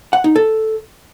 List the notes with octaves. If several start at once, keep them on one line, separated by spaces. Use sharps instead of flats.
F#5
D#4
A4